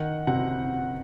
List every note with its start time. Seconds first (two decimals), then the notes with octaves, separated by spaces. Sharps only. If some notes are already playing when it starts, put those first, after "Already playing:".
Already playing: D#3 F#5
0.27 C3 F#5